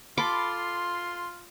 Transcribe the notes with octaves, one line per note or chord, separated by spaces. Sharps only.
F4 A4 B5 C6 D6